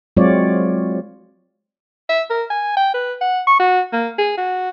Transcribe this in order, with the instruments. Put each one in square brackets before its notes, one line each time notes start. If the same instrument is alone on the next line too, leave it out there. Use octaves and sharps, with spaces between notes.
[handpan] F#3 G#3 C4 F4 C#5 D5
[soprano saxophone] E5
A#4
G#5
G5
B4
F#5
C#6
F#4
A#3
G#4
F#4